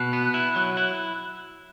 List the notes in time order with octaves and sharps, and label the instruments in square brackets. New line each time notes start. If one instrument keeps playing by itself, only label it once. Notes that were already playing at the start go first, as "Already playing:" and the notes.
Already playing: [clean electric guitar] B2 [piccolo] F#6
[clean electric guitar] B3
E4
F#3
E4